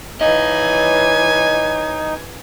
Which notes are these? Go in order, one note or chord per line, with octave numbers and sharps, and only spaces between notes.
E3 D#4 C#5 D#5 G#5